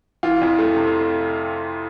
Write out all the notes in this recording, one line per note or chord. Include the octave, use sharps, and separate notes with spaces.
E3 F4
F2
A3
C3